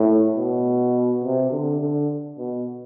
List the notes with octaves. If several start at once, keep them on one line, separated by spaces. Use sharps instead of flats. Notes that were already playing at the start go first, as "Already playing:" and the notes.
Already playing: A2
B2
C3
D3
D3
B2